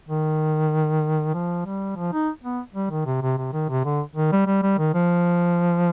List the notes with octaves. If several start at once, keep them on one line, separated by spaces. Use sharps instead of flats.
D#3
F3
G3
F3
D#4
B3
G3
D#3
C3
C3
C3
D#3
C3
D3
D#3
G3
G3
G3
D#3
F3